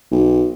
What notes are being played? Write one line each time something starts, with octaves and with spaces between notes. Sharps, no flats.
B1